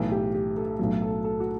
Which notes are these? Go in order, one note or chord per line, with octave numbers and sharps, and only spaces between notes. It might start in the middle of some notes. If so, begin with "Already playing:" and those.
Already playing: B1 A2 E3
G4
G4
A4
B1 A2 F#3
A4
A4
F#4